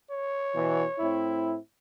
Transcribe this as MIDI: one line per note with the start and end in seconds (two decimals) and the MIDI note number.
0.11 1.21 73
0.55 0.83 47
0.55 0.83 52
0.99 1.56 45
0.99 1.56 60
0.99 1.56 64